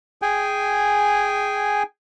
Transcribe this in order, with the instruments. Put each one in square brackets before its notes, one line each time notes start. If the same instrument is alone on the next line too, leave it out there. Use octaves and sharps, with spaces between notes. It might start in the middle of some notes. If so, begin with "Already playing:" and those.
[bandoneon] G#4 G5 G#5